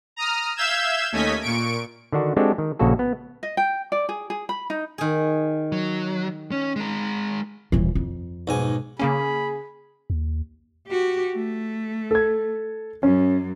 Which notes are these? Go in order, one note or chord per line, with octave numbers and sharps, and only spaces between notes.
A#5 D#6 F6
E5 F5 E6 G6 G#6 E7
D#2 A3 C#4 D#5 G#6 B6
A#2 C#6 D7
D3 D#3 D4 F#4
G#3 C4 D4 F#4 G4 A4
D#3
A#1 C#3 A#3 F#4 A4
B3
D#5
G5
D5
G#4
G#4
B5
D#4
D#3 G#4
F#3
C#4
G#3 A#4
D#1 E3
F2
B1 G#2 G#5
C#3 A#3 C#4 G#4 B5
D#2
F#4 G4
A3
A4 G#6
F#2 C#4